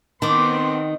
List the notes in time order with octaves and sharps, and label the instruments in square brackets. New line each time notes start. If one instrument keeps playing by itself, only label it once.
[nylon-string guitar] D#3 [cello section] B3 C4 [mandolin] A5 D6 [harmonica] C6